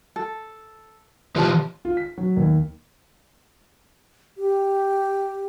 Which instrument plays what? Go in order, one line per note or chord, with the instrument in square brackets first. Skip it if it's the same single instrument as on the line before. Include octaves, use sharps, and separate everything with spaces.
[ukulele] A4
[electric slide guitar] E3 F4 G4 [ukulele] B4 A5
[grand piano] F4
B6
F#3
D#2
[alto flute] G4